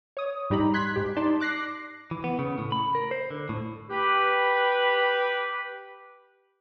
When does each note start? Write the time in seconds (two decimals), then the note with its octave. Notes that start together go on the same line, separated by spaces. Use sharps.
0.17 C#5 D#6
0.50 G#2 G3 D#4 G4 A#5 B5
0.74 C6 F#6 G#6 B6
0.96 G#2 G4
1.16 D#4 D5 A5 C6
1.40 D6 F#6 A#6 C7
2.11 E3
2.24 B3
2.39 C#3
2.58 A2
2.72 B5
2.95 A#4
3.11 C5
3.31 D3
3.49 A2
3.90 G4 B4